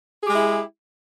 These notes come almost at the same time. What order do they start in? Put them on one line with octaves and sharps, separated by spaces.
G#4 G4 G#3 E4